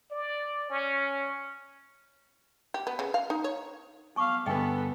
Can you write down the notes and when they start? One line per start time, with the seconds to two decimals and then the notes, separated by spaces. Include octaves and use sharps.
0.11 D5
0.70 C#4
2.74 G4
2.87 B3
2.99 C#3
3.14 F5
3.30 D#4
3.44 C#5
4.16 B3 F5 A5 C#6 D6
4.46 G2 D3 B3 A4 B4 D#5 G5 G#5